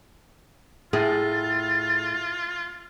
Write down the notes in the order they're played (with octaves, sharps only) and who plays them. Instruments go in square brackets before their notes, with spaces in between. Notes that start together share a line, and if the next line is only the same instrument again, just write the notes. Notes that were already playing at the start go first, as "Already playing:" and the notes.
[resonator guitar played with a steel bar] A2 [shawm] F4 [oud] G#4 [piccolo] A6